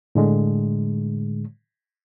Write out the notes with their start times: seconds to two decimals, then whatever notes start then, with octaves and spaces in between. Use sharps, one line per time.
0.15 A2 D3 G#3